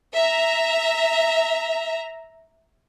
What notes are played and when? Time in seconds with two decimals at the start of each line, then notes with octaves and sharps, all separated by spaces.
0.15 E5 A#5